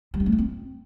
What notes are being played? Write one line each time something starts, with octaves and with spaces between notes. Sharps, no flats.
G3
C#4
A3
F4
C4